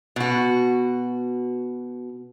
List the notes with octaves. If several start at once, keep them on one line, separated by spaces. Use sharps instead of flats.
B2 F#4